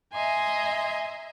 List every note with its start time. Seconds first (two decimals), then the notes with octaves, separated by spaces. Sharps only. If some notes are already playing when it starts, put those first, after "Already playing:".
0.13 D#5 E5 G#5 A#5 C6